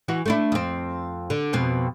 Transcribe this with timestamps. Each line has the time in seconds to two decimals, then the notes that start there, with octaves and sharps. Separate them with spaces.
0.08 E3 E4 F#4
0.26 A3 D4 E4
0.52 F2 C4
1.30 D3
1.53 F2 B2 C4